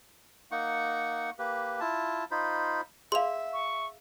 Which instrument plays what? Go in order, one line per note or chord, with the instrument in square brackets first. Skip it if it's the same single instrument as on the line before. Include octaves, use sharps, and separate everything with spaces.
[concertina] A#3 D#4 F#5 C#6
A#3 G4 B4
E4 F4 A5
D#4 F4 C5 B5
[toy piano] G#4 D5 F5 [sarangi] E5 [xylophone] C6 F7
[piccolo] C#6